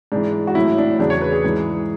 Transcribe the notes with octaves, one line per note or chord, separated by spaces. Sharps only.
G#2 E3 D4
F#4
A2 F#3 E4
D4
E2 C#3 F#3 D4
C#5
B4
G#4
G#2 E3